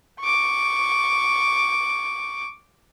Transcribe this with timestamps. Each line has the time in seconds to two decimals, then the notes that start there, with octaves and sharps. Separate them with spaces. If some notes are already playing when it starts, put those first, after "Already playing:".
0.20 C#6 D6